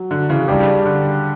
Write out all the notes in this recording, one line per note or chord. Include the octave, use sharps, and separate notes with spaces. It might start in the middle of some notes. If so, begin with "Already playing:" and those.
Already playing: F#3
D3
C#3 E3
C#3 G3 D4 G4
D3